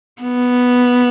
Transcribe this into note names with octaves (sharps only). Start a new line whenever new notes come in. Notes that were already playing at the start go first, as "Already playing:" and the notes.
B3